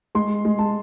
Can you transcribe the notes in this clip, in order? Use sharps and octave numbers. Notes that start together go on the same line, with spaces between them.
G#3 C6
G#3
A5